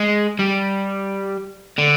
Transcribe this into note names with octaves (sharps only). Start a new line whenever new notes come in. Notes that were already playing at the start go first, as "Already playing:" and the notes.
Already playing: G#3
G3
D3